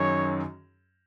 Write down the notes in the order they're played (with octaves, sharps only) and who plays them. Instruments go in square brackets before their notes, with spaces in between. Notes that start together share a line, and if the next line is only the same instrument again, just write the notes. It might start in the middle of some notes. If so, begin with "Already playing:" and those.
Already playing: [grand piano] F#2 D#3 F#3 C#4 G#4 [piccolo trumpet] C#5